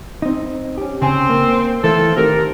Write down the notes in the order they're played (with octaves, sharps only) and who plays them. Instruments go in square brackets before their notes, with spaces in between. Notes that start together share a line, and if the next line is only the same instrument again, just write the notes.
[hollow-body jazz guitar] C4 D#4
C#4 G4
[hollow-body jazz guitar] C#3 G#5 [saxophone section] C4
[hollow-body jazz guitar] A#3
[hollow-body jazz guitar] E3 A3 [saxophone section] C4 F4 A4
[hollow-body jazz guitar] D#3 C4 G4 [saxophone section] A#4